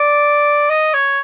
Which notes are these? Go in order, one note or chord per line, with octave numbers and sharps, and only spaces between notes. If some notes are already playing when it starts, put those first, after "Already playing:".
Already playing: D5
D#5
C#5